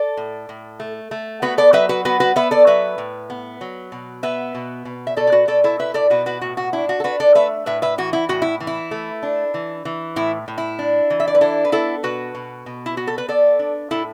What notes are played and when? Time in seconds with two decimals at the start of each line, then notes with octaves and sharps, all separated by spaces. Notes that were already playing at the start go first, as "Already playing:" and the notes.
Already playing: A4 D5
0.17 A2
0.49 A2
0.80 A3
1.11 A3
1.42 B3 F#4 B4
1.58 A4 D5
1.73 F#3 B4 E5
1.89 F#4 B4
2.05 B3 F#4 B4
2.20 F#4 B4
2.36 B3 B4 E5
2.51 A4 D5
2.67 F#3 B4 E5
2.98 A2
3.30 B3
3.61 F#3
3.92 B2
4.23 B3 B4 E5
4.55 B2
4.85 B2
5.07 E5
5.17 B2 A4 D5
5.27 D5
5.32 F#4 B4
5.47 B2 A4 D5
5.64 E4 A4
5.79 E4 B4 E5
5.94 A4 D5
6.10 B2 F#4 B4
6.26 F#4 B4
6.41 A2 F#4
6.57 F#4
6.73 D4 E4
6.89 F#4
7.00 A4
7.04 D4 F#4 B4
7.20 A4 D5
7.35 A3 B4 E5
7.66 A2 B4 E5
7.82 B4 E5
7.98 E3 F#4
8.13 E4
8.29 A2 F#4
8.42 E4
8.60 E3
8.67 E4
8.91 A3
9.23 D4
9.54 E3
9.85 E3
10.16 A2 E4
10.48 A2
10.58 E4
10.79 D4
11.10 E3
11.20 E5
11.27 D5
11.35 B4
11.41 D4 E4 A4
11.65 B4
11.72 B3 E4 A4
12.03 B2 F#4 B4
12.35 B2
12.66 B2
12.86 E4
12.97 B3 F#4
13.07 A4
13.18 B4
13.29 B3 A4 D5
13.59 D4
13.91 A2 E4 A4